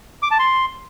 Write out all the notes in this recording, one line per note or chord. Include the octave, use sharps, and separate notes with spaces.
D6
A5
C6